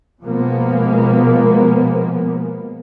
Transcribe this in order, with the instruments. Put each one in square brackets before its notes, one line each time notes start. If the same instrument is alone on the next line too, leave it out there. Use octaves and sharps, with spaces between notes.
[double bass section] B2 F3 G#3 A#3 B3